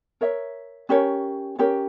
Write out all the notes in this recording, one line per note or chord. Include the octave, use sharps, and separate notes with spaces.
A#4 C#5 E5
C#4 G4 A#4 C#5
C#4 G4 A#4 C#5